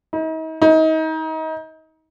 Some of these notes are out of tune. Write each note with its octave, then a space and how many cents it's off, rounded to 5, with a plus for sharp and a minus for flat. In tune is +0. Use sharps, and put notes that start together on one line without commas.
D#4 +40
D#4 +30